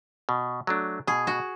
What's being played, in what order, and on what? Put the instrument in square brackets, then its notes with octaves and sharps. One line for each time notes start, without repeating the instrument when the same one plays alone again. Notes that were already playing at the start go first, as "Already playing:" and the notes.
[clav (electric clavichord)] B2
F#3 A3 D4
[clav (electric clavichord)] B2 [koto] G#4
[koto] F#4